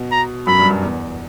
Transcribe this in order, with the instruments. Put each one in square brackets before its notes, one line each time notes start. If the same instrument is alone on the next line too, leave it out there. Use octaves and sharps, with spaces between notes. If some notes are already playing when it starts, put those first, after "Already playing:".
Already playing: [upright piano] B2
[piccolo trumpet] A#5
[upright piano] F#2 [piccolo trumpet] B5
[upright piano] G2
F#2
E2